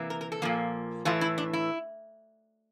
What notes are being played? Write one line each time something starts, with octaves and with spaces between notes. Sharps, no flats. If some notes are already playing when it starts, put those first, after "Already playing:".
Already playing: C3 E3 A#3
A#4
A#4
A4
A#2 F3 A#3
A2 E3 A3 F4
E4
D4
E4